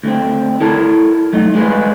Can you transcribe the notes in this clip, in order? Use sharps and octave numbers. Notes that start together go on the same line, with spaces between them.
D2 D3 C4
E4 A4 A#4 A5
F#3 A3 D#4
D3 G#3 G#4 B4 C5